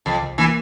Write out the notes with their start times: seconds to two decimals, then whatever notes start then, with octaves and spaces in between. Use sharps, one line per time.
0.06 C2 F2
0.23 C2
0.38 E3 A#3